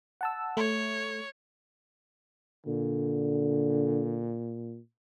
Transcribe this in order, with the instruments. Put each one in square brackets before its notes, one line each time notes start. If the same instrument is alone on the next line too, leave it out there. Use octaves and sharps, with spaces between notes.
[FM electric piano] F#5 A5 E6
[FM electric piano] A3 [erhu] C#5
[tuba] A#2 [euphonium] D3